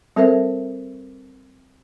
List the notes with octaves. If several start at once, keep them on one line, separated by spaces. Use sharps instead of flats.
G3 C4 A4 A#4 C5 E5